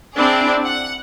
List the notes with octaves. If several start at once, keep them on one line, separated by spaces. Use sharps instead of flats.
C4 D4 E4 G#4 D5
F#5